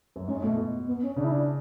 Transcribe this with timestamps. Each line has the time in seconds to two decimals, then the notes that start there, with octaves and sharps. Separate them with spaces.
0.16 F#2
0.28 G#2 C#4
0.42 B2 A3
0.57 B2
0.88 B3
1.03 C#4
1.16 C#3 D4
1.24 E4
1.32 D4